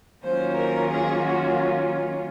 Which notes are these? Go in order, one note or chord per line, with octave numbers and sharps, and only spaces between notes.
D#3 F#3 A#3 C#4 F4 C5
A#4
G#4
F#4